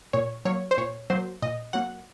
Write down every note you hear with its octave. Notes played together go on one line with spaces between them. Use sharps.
A#2 C#5
F#3 A#3 C#5
C5
A#2 C#5
F#3 A#3 C5
A#2 D#5
F#3 A#3 F#5